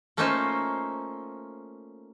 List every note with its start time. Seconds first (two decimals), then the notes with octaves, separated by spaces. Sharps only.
0.17 A3 A#3 C#4 D#4 F4 C5